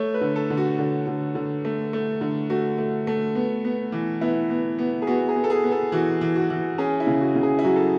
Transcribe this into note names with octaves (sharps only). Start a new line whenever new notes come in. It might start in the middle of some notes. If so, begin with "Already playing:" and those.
Already playing: A3 C#5
B4
D3
A4
D3
F#4
D3
D3
D3
A3
A3
D3
A3 F#4
A3
A3
B3
B3
E3
B3 E4
B3
B3
G#4
B3 F#4
G#4
B3
A4
G#4
B3
A4
E3 F#4
E3
F#4
E3
C#4 G#4
E4
C#3
F#4
C#3
G#4
E4
F#3 F#4
A4